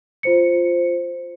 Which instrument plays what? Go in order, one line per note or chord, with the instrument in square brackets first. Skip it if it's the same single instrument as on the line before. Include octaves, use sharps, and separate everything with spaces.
[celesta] F4 C5 C#7